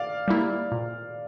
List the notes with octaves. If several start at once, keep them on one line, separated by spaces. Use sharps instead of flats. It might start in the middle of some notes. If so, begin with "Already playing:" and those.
Already playing: D5 F5
G3 A#3 E4
A#2